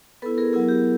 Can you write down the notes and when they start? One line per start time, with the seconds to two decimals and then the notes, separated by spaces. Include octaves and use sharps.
0.22 B3 E4 A4 B4
0.38 G#4 A#4
0.53 F#3 B3 E4 G#4 A#4
0.68 G4